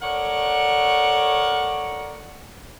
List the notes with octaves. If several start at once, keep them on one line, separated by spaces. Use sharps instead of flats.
A4 A#4 C#5 D5 F#5